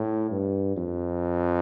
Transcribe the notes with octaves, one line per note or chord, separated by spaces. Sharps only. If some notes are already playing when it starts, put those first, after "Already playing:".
Already playing: A2
G2
F2